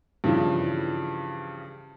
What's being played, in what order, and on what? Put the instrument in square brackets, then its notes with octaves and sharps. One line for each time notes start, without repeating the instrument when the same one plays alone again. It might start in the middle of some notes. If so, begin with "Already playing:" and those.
[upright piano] G2 C#3 E3 F3